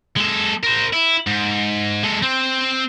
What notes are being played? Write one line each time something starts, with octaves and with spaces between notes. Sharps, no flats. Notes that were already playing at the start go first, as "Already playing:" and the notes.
G#3 A4
A#4 C5
E4
G#2
G#3 A4
C4